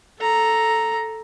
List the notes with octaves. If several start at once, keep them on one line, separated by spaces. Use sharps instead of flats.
A4 A#5